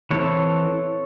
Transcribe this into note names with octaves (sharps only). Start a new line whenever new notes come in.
E3 C4 A4 C#5